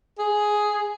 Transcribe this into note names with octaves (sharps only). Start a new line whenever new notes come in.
G#4